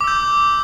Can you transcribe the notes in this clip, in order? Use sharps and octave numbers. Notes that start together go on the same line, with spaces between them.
D6 E6 G6